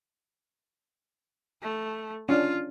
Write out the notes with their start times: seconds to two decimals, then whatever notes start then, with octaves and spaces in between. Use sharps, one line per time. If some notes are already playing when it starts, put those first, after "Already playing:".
1.62 A3
2.29 C#4 D4 F4